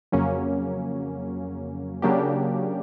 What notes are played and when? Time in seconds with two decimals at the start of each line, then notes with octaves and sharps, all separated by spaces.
0.12 F2 C#3 F#3 A#3 C#4
2.02 C#3 F#3 A#3 D4 G4